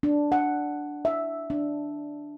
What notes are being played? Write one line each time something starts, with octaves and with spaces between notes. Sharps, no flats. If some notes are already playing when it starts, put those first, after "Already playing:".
D4
F#5
E5
D4